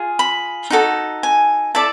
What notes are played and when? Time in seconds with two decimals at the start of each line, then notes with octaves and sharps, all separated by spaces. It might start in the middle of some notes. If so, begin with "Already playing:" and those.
Already playing: F4 G#4
0.19 B5
0.70 D#4 F#4 A4
1.23 G#5
1.75 E4 A4 D5 A5